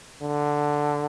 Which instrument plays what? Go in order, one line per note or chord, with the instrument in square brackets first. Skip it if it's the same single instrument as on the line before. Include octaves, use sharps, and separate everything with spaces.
[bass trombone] D3